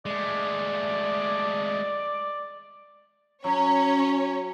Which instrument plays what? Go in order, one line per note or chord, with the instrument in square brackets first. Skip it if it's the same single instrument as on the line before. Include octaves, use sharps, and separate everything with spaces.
[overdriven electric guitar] G#3 A3 [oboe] D5
[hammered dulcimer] F#3 [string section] C#4 C#5